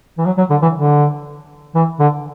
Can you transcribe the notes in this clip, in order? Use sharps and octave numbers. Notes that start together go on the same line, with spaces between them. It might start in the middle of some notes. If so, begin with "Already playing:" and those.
E3
F#3
F#3
D3
E3
D3
E3
D3